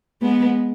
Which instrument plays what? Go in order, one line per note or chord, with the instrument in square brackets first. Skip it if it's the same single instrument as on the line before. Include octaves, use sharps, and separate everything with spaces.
[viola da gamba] G#3 B3